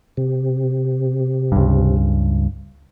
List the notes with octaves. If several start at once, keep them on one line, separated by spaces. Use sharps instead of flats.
C3
C#2 G2